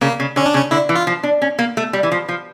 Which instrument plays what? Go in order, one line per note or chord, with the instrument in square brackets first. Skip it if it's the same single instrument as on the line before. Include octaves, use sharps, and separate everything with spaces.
[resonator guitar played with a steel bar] C#3 [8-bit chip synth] A#3
[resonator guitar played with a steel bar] C#3
[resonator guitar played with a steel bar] D3 [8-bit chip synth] C#4
[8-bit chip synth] D4
[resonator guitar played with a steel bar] C#3 [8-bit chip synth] C#4
[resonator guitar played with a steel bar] D3 [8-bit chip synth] E4
[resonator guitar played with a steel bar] E3
[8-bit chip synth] F4
[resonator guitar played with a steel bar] F3
D4
C#4
A#3
A3
G3
E3
F3
F3